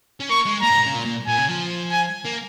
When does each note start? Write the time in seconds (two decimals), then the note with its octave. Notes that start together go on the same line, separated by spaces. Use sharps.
0.20 C#4
0.30 A#3 C#6
0.46 G#3
0.62 A#3 A#5
0.70 G#2
0.78 A#2
0.86 C#3
0.95 A#2
1.06 A#2
1.27 A#2 G#5
1.38 C#3
1.48 F3
1.92 G#5
2.25 A#3